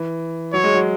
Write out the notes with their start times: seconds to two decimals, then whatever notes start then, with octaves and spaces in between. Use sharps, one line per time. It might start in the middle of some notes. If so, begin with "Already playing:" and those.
Already playing: E3
0.53 F#3 C#5
0.64 G#3
0.74 F#3